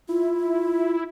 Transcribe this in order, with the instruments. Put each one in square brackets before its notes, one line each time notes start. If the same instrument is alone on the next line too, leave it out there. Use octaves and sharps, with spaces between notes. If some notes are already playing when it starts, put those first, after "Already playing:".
[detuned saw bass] E4 [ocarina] F4